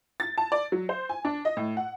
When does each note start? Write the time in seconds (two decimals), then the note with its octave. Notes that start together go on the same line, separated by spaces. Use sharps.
0.20 A6
0.38 A5
0.52 D5
0.72 F#3
0.89 C5
1.09 G#5
1.25 D4
1.45 D#5
1.57 A2
1.77 F#5